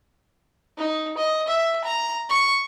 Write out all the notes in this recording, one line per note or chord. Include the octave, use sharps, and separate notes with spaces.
D#4
D#5
E5
A#5
C#6